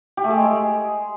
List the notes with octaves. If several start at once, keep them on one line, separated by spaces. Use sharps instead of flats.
G4
A3
G#4
G#3